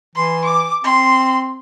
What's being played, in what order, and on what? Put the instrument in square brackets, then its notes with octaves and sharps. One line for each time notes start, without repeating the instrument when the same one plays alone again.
[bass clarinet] E3 [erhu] C6
[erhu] D6
[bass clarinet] C4 [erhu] C6